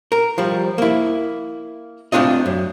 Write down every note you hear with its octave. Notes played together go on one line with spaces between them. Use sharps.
A#4
F3 G3
A#3 E4
A3 C4 D4 F4 D#5
F#2